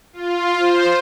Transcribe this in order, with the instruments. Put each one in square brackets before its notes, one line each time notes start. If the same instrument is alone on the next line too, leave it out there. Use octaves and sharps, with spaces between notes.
[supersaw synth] F4
C5